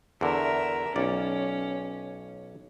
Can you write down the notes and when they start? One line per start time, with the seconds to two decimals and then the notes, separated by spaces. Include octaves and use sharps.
0.21 E2 D3 A#4 E5
0.96 B1 C#4 D5